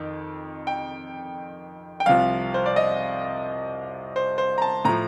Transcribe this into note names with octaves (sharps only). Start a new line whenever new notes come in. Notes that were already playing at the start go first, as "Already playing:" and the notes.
Already playing: F2 D#3
G5
G5
C2 C3 F3 F5
C5
D5
D#5
C5
C5
A#5
A5
A2 F3 A#5